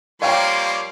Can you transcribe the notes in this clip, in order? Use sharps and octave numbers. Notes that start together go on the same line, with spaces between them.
F3 G3 A#3 C#5 F5 G5 A#5 C6